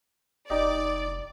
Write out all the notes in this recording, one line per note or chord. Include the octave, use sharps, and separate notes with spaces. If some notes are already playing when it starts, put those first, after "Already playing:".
F1 D#4 G4 D5 D#5